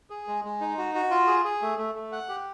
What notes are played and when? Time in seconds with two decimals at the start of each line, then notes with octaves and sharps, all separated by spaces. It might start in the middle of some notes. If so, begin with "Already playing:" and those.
0.10 G#4
0.28 G#3
0.44 G#3
0.61 D#4
0.78 F#4
0.95 F#4
1.11 F4
1.27 G#4
1.45 G#4
1.62 A3
1.78 A3
1.95 A3
2.12 F#5
2.29 G4